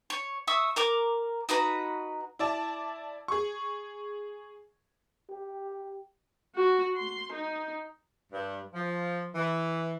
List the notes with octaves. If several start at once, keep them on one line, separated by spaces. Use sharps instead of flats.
C#5
E5 C#6 D#6 E6
A#4 A#5 D6
D#4 F#4 B4 A#5
E4 D5 A5
G#4 C#6
G4
F#4
C6
D#4
G2
F3
E3